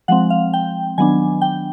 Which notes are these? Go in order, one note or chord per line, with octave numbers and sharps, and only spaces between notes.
F3 G#3 C4 F#5
F5
G5
D#3 F#3 B3 D4 G#5
G5